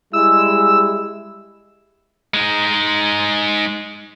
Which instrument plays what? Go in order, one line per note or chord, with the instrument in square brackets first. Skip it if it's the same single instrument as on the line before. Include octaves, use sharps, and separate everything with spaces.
[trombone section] G3 G#3 E4 [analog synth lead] E6
[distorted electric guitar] G#3 D#4